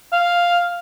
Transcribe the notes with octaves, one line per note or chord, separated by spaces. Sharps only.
F5